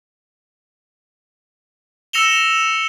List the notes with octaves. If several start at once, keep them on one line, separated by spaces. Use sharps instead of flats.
E6 A#6 C#7 E7 F7 G7